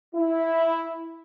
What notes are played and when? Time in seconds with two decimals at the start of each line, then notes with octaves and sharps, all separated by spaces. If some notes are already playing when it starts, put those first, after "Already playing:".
0.15 E4